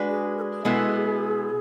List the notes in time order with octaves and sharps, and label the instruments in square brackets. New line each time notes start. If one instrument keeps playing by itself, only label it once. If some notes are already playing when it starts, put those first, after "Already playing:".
Already playing: [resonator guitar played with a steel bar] G#3 D4 F#4 B4
[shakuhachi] G#4
A#4
G#4
[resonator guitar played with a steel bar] B2 G#3 B3 E4 A4